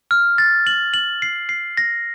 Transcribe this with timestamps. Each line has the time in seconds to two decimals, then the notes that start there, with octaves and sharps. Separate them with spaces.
0.11 F6
0.38 A6
0.67 F#7
0.94 F#7
1.22 C7
1.49 C7
1.77 A#6